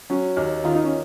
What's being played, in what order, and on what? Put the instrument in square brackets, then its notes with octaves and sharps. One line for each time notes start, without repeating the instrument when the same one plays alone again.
[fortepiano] F#3 C#4
D#2
D#3 F4
D#4
C#4